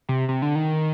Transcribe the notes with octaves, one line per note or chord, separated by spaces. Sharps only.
C3
C3
D3
D#3